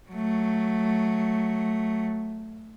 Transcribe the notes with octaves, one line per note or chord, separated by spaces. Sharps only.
F#3 A3